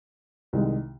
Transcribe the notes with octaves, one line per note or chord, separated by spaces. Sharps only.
C2 C3 D#3 G#3